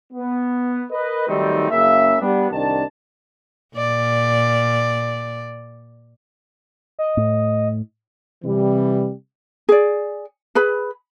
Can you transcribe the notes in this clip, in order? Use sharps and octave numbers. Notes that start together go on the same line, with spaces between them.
B3
A#4 B4 D#5
D#3 F#3 G3 A3 C4 D#4
F#1 C#3 A#3 E5
G3 B3 D4
C2 D#3 D4 A5
A#2 D5
D#5
A2
C3 E3 G3
G#4 D5
G#4 B4 B5